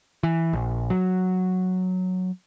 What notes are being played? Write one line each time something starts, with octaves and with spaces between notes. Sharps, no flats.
E3
A#1
F#3